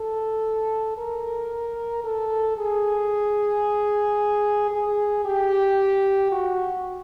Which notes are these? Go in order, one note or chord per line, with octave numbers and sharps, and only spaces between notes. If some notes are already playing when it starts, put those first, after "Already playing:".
Already playing: A4
A#4
A4
G#4
G#4
G4
F#4